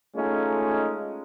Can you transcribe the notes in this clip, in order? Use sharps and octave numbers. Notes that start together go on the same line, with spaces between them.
G#3 A3 C#4 D#4 F4